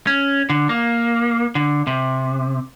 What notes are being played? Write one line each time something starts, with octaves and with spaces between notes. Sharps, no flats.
C#4
D3
A#3
D3
C3